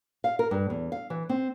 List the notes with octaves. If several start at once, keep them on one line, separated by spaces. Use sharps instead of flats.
F5
A#4
G2
E2
F5
E3
C4